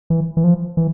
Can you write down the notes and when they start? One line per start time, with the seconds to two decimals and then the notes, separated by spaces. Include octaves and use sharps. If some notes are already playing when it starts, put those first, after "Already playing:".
0.10 E3
0.37 E3
0.44 F3
0.77 E3